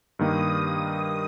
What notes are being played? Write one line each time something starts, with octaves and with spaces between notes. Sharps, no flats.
G2 D#3 A#3 D#6